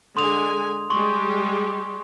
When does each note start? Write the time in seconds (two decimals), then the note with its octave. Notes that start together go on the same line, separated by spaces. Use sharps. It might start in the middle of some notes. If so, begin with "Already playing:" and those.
0.17 D3 G#3 G#5 C6 D#6 F7
0.90 G3 G#3 G4 C6 C#6